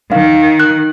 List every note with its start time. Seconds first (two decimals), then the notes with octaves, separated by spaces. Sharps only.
0.12 D#3 F5
0.60 F#6